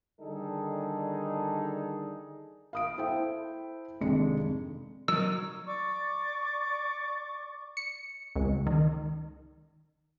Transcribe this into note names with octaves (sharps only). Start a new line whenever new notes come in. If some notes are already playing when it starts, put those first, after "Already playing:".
D3 D#3 G3 D#4 G#4 A4
F5 D#6 D7
E4 A4 C5 E5 G5
G#1 F2 C3 G#3 D4 C#7
F#3 D#4 A#4 E6
D5 C#6 D6
C#7
C#2
D#3